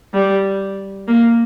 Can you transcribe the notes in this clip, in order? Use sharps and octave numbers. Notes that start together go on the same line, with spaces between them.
G3
A#3